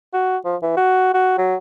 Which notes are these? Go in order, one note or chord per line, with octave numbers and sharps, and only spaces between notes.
F#4
F3
E3
F#4
F#4
F#3